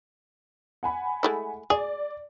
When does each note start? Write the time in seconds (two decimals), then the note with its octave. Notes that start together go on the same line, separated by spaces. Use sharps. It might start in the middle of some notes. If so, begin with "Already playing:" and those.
0.83 F#5 G#5 B5
1.23 G#3 A3 E4
1.70 G#4 D5